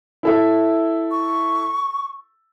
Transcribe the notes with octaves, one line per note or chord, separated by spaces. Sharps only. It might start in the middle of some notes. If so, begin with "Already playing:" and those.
E4 A4 E5
C#6